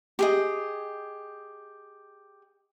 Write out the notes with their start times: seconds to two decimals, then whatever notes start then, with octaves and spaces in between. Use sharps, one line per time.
0.19 G4 G#4 D#5